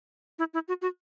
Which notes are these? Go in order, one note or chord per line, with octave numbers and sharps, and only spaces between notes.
E4
E4
F#4
F#4